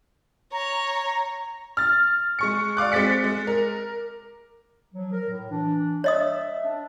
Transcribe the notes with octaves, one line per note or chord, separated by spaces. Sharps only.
C#5 A#5
F6 A6
G#3 C#6 C#7
D5 F5 D6 F#6
G#3 C4 A6 B6 C#7
G#3
A#4
F3 F#3
A#4
A2
E3 D4
C#5 D#5 E5 D#6
D4